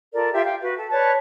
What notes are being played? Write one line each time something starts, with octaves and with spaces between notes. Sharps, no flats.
F4 A4 A#4 D5
F4 G4 E5 G5
F5 G5
F#4 B4
A4
B4 C#5 D5 A5